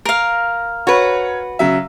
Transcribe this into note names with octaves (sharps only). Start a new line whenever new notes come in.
A#4 F5
F#4 B4 C#5
C#3 F#3 E5